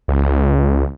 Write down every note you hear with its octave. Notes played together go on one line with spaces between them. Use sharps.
C#2